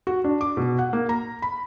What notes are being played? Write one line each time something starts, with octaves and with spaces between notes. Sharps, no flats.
F#4
D4
D6
B2
F#5
A#3
A#5
B5